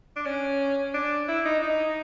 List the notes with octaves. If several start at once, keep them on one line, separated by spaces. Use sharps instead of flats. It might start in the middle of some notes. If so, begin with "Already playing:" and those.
D4
C#4
D4
E4
D#4
D#4